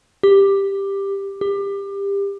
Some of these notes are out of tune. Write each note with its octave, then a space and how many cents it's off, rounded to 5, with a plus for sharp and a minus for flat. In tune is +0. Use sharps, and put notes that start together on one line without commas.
G4 +10
G4 +25